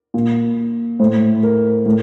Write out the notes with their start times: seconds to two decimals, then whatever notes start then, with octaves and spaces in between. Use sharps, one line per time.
0.14 A#2
0.99 A2 C5
1.43 A#4
1.86 A2